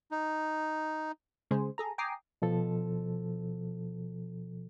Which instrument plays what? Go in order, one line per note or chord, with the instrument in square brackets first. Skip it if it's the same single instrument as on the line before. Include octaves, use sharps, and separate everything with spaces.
[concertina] D#4
[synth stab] C#3 G#3 G#4 C5
G#4 A4 A#5
G5 G#5 A#5 D6 D#6 C7
[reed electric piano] B2 F3 A4